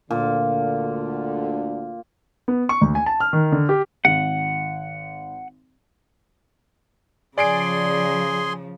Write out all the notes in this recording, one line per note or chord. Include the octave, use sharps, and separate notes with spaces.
D2 A#2 D3
B3
C#6
D2
G#5
A5
F6
D#3
D3
G4
G#1 F#5
C#3 F3 G#4 D5 G#5 C6 C7 D7